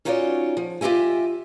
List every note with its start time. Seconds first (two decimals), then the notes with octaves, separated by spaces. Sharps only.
0.05 C#4 D#4 F4 F#4 C#5 D5
0.57 F3
0.81 F4 G4 D#5 E5 G#5